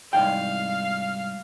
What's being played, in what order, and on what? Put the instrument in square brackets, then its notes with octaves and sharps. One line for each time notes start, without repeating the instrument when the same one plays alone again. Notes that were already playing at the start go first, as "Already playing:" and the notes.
[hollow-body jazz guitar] C2 G#2 G5 [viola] F5